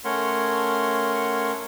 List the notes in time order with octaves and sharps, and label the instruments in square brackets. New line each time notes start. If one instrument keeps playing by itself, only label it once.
[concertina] A3 C#4 A#4 C#5 F#5 C6